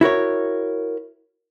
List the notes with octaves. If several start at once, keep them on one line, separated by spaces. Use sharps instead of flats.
E4 F#4 A#4 C#5